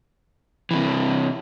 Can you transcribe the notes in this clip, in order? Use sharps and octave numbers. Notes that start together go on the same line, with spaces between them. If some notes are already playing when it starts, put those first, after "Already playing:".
C3 E3